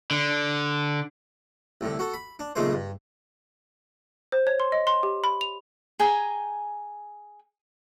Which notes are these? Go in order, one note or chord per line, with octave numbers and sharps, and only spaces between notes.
D3
C2 A2 D3
F#4 A4
B5
D4
B1 A#2 C#3 G#3 A3 C5
G2
C5
C#5
C6
D#5
C6
G4
B5
F7
G#4 G5 G#5 A#5